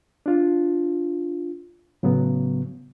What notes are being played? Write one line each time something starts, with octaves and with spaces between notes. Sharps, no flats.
D4 F4
A2 C#3 F#3 B3